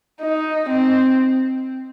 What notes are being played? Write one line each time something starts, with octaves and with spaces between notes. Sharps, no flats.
D#4
C4